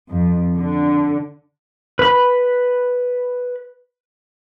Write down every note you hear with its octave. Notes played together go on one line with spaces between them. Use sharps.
F2
D3
B4 B5